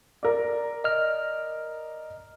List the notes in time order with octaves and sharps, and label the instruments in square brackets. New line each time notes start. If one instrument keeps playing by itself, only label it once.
[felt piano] A#4 D5
[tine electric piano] D#5 F6